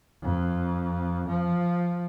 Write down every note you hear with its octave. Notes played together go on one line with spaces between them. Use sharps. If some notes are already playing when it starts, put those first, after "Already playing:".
F2
F3